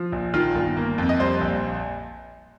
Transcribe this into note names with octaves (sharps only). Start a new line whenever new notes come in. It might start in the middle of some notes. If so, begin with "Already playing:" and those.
Already playing: F3
A#1
D#3 F4
G1
A#3
F2
D#5
G3 C5
A#1